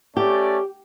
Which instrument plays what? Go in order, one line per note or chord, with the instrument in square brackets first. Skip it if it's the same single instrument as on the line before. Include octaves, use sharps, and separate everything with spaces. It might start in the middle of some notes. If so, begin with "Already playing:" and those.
[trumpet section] A3 C#4 D5 [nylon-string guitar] G4